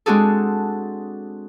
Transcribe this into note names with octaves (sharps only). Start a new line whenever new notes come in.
G#3 C4 D4 F#4 G#4 A4